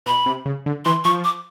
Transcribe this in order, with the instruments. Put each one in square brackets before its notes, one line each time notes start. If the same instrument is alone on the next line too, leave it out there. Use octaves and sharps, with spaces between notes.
[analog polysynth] B2 [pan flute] B5
[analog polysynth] C3
C#3
D3
[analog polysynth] E3 [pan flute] C6
[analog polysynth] F3 [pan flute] C#6
[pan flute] D6